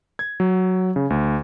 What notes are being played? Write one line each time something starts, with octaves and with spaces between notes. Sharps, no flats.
G#6
F#3
C#3
D2